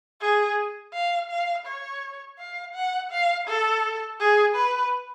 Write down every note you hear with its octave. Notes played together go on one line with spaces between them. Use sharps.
G#4
F5
F5
C#5
F5
F#5
F5
A4
G#4
B4